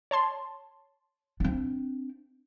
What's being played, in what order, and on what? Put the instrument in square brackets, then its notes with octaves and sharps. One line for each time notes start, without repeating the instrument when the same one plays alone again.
[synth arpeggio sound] C#5 A5 C6
[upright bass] C4 D4